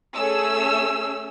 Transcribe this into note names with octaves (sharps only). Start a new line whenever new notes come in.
A3 C#4 G#4 E6